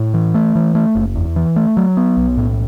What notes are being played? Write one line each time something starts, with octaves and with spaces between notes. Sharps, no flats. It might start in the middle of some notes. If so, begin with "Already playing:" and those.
Already playing: A2
E3
A3
E3
A3
F#1
E2
E3
A3
F#3
B3
B1
A2